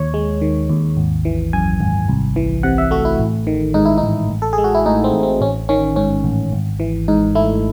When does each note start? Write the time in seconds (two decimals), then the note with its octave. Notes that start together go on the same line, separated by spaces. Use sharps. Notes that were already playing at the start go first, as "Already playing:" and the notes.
Already playing: D#2 C#5
0.14 G#3
0.41 D#3
0.70 D#2
0.97 G#1
1.25 E3
1.53 F#2 G#5
1.81 G#1
2.08 C2
2.36 E3
2.63 C3 F#5
2.78 E5
2.91 A3 F#4
3.05 E4
3.19 A1
3.47 D#3
3.74 G#2 D#4
3.85 E4
3.98 D#4
4.03 A1
4.30 A1
4.42 A4
4.53 G#4
4.58 G#3
4.64 F#4
4.75 E4
4.86 A2 D#4
5.04 C4
5.13 A1
5.23 C4
5.41 A1 C#4
5.69 D#3 C#4
5.96 G#2 C#4
6.24 A1
6.53 G#1
6.80 E3
7.08 G#2 D#4
7.35 A3 E4